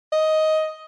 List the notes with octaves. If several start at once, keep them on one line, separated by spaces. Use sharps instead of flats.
D#5